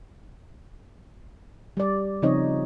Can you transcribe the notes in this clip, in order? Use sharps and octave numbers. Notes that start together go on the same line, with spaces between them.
G3 D5
C#3 F3 C4 D#4 C#5 D#5